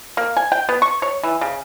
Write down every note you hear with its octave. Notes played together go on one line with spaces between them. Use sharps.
A#3
G#5
G5
B3
C#6
C#5
E3
C#3